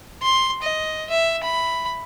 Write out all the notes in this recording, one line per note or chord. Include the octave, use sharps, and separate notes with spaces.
C6
D#5
E5
B5